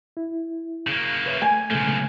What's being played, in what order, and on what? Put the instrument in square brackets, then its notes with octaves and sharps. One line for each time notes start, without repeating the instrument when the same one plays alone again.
[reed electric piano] E4
[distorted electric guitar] C#3 A#3
[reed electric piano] B4 C#5 E5
[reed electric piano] A3 [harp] G#5
[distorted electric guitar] B1 F3 [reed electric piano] C#3 G#3 A3